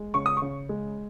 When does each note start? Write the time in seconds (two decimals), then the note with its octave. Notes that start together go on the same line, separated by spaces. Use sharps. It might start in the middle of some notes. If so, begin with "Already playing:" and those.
Already playing: G#3
0.14 C#3 C#6
0.26 D#6
0.37 C#3 C#6
0.69 G#3